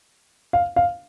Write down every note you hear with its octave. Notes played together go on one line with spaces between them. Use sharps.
F5
F5